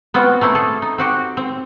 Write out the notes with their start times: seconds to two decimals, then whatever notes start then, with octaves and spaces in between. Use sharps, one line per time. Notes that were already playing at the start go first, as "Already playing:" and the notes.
0.14 B3 C4 F4 F#4
0.41 A3 A#3 C4 E4
0.55 G#4 A4
0.82 D#4
0.98 C4 F#4 G4
1.37 C4